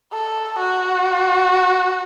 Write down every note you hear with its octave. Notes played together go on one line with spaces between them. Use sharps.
A4
F#4